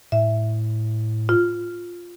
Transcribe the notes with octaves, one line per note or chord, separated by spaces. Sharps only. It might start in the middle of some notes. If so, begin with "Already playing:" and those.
A2 E5
F4